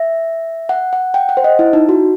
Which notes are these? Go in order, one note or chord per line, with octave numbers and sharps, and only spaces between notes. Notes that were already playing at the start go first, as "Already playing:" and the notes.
Already playing: E5
F#5
F#5
G5
F#5
C5
D#5
E4
D#4
F#4